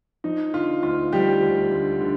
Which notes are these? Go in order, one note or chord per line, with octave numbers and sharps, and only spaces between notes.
F3 D#4
D3 F4
D2 F4
F3 G3 G4
D2
D2
D3